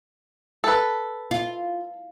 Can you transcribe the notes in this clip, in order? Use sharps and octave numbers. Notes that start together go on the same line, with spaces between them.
A4 B4
F4